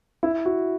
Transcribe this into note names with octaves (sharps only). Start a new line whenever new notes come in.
E4
F#4